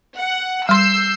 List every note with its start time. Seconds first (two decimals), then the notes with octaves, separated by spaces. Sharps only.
0.18 F#5
0.69 G3 C6 E6 G6 C7